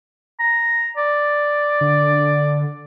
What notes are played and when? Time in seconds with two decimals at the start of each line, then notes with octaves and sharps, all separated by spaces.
0.40 A#5
0.97 D5
1.81 D3